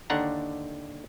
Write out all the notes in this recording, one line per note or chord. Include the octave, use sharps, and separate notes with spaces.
D#2 D3 D4 F#5 A#5